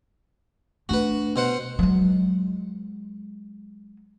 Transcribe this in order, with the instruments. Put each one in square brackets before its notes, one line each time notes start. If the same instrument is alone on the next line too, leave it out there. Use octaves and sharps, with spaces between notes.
[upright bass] A3 D4 [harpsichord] F#4 B4
[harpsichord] B2 C5 F#5
[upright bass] F#3 G#3